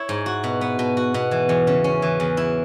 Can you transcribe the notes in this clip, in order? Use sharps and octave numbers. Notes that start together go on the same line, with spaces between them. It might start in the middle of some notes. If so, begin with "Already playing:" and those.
Already playing: E4 C#5
G#2
F#4
B2
B3
B2
F#4
B2
E3
E2
C#3
C#4
E3
E2
E4